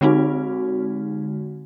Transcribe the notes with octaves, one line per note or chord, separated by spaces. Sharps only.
D3 G#3 C4 D#4 F#4